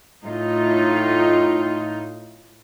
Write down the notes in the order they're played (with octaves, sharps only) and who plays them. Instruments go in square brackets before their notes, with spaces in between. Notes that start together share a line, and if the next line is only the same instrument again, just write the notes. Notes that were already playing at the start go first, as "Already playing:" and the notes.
[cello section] A2 D#4 F4